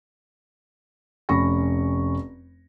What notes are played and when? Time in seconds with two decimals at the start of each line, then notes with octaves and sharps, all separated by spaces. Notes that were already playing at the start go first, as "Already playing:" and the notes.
1.29 F1 C#4 B5 C#6 A#6